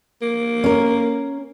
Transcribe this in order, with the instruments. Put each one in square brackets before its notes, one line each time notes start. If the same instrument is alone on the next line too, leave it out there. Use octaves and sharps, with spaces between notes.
[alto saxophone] A#3
[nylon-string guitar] C#4 A#4